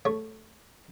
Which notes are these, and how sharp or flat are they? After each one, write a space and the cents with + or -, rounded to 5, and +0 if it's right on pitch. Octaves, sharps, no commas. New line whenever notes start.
A3 +0 C#5 +0